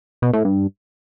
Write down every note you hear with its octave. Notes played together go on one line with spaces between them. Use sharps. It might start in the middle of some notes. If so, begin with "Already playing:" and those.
B2
A2
G2